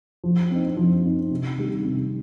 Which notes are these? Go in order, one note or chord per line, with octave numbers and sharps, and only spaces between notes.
F3
C4 D#4
F3
C4 D#4
C3
D#3 G3
C3